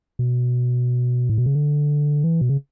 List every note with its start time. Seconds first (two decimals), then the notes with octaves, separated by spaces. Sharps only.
0.19 B2
1.29 A2
1.38 B2
1.46 C#3
1.55 D3
2.24 E3
2.41 B2
2.49 C#3